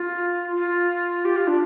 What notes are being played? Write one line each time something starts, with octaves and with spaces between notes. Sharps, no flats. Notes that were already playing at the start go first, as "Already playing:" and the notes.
Already playing: F4
F4
G4
F4
D4